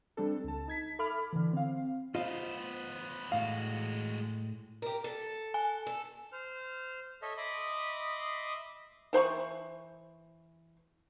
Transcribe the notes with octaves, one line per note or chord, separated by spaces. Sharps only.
G3 C4 D4 A4
C#2 A5
D#4 G#6 B6
A4 E5 B5 D6 F6
D3 E3
C4 F5
B3 F4 C5 D#5 F5
A2 G#3 F#4 F5
G4 A#4
A4
G#5
A4
C5 F6
A4 C#5 D#5 E5
D#5 E5 B5 C6 D6 D#6
E3 C5 B5 C#6